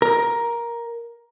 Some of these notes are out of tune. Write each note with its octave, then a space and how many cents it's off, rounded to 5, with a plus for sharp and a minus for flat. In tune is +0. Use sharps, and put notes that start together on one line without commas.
A#4 +10